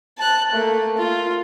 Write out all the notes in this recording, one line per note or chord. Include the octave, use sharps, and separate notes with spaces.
A5 F#6
A3 A#3
F4